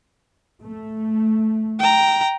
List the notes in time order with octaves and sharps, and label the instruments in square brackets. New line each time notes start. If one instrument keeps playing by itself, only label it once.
[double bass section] A3
[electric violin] G5 A#5